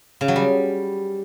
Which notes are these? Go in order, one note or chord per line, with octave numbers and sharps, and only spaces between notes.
C#3
F#3
G3